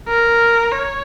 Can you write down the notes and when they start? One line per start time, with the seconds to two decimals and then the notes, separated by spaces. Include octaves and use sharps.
0.09 A#4
0.72 C#5